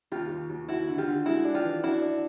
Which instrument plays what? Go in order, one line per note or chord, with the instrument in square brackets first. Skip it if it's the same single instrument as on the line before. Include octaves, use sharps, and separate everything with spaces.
[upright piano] D#2 [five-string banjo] F4 G4
[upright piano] D#2
D#2
[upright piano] D#2 [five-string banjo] E4 F#4
[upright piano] D3
[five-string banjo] F4 G4
[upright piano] D3
[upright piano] G#3 [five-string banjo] E4 F#4
[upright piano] D4
[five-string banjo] F4 G4
[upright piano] E3
[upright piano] D4 [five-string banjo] E4 F#4
[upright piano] D4